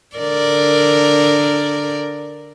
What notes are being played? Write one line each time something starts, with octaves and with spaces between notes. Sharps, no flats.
D3 A#4 D5